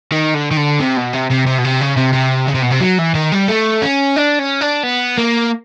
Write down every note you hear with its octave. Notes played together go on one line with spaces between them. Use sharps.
D#3
D3
D#3
D3
C3
B2
C3
C3
C3
B2
C3
C#3
C3
C3
C#3
C3
B2
C3
F#3
E3
D#3
G3
A3
C#4
D4
C#4
D4
B3
A#3